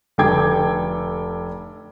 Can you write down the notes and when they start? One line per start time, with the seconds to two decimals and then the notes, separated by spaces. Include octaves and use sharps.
0.18 F1 D3 A4 G5 D6 G#6